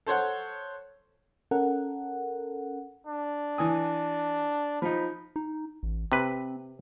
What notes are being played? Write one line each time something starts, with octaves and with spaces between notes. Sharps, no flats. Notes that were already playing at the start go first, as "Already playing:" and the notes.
A4 C5 C#5 F#5
C#4 A4 A#4 F#5
D4
E3 G#5 D#6
F3 D#4 B5
D#4
A1
C3 C4 B4